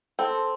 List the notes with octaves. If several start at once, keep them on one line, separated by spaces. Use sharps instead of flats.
C4 A4
A4